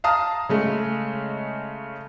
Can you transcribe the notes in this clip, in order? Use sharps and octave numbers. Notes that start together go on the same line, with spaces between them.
F5 A5 A#5 D#6 F6
C#3 G#3 A3